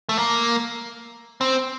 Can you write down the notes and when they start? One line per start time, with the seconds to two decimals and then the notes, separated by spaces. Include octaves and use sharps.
0.09 A3
0.18 A#3
1.41 C4